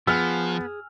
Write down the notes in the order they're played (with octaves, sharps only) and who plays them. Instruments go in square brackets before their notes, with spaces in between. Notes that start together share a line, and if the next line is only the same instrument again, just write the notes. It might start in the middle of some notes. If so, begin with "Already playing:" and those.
[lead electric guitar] F3 [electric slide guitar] B3 [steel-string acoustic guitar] G#4 [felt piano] E6 F6